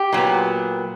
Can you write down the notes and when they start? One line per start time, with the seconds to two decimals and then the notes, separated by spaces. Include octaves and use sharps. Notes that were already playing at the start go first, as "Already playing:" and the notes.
Already playing: G4
0.12 A#2 F#3 B3